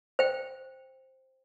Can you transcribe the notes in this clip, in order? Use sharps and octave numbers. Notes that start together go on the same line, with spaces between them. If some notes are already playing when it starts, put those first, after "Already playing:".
C5 G5